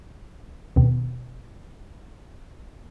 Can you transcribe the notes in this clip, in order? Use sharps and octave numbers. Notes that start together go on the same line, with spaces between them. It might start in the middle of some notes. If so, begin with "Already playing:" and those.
D#2 B2